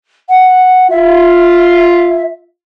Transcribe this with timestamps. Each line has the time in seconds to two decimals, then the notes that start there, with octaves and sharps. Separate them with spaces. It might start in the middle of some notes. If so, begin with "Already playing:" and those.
0.29 F#5
0.90 F4 E5